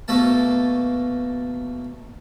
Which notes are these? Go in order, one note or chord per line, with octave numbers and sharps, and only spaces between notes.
B2 A3 A#3 A5